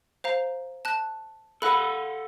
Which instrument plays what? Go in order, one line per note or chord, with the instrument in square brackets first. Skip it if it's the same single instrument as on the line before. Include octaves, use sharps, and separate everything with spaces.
[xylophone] C5 F5 A#5
A5 F#6
[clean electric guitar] A4 F5 F#5 [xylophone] B5 F#6